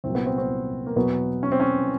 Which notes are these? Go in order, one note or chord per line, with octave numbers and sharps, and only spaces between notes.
C2 A#2 F#3 C4
B3
C4
C4
A#3
E2 B2 F#3 B3
C#4
C4
C#4